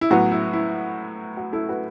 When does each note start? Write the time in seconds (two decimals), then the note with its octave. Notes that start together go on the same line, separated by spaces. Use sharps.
0.01 E4
0.11 A2 F#3 B3 F#4
0.31 E4
0.53 E4
1.37 F#4
1.53 E4 A4
1.69 F#4 B4